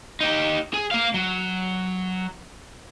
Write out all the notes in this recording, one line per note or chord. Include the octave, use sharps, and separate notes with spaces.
D#4 G4
G#4
A#3 F5
F#3